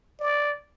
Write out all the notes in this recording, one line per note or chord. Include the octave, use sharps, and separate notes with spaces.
D5